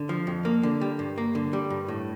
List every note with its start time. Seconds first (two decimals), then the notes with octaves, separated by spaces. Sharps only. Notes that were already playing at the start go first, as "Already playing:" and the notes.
Already playing: D3
0.09 F3
0.27 F2
0.45 A#3
0.63 D3
0.81 G3
0.99 G2
1.18 A#3
1.35 D3
1.53 G3
1.70 G2
1.88 A2